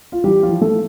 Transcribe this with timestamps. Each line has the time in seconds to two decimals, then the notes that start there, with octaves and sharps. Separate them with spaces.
0.12 F4
0.24 E3 G3 G4
0.43 F3 F4
0.49 E3
0.61 A3 A4